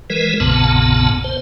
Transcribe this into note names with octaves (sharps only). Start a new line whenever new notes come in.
E3 G#3 A#4 B4
A#1 F2 A#2 C#3 B3 A5
C5